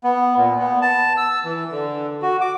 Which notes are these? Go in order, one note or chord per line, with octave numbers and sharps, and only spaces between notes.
B3
A#2
B3
A5
E6
E3
D3
F#4
D6